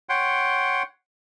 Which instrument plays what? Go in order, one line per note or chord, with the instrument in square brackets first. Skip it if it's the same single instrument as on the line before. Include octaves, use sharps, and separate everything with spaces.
[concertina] C#5 F#5 G5 C6